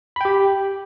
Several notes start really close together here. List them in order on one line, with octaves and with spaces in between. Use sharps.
B5 G5 G4